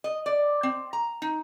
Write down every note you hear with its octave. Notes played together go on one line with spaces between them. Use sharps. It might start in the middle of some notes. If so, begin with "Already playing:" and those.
D#5
D5
C4
A#5
D#4